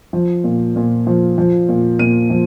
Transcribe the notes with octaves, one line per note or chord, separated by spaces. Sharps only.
F3
A#2
A#2
F3
F3
A#2
A#2 D#7
F3